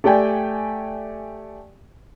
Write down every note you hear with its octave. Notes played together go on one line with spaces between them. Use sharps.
A3 G4 D5 G5 G#5